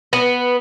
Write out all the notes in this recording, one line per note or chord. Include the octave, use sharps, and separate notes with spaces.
B3